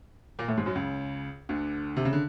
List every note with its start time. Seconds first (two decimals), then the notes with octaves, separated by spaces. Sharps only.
0.39 A#2 A#3
0.48 A2 A3
0.57 G#2 G#3
0.66 F#2 F#3
0.75 C#2 C#3
1.49 D2 D3
1.97 C3
2.05 C#3
2.13 D3